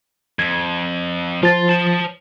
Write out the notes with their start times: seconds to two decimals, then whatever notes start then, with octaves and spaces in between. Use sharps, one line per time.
0.39 F2 G#6
1.43 F3 F4 A6
1.69 C5 A5